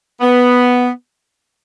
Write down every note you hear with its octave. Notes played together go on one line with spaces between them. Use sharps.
B3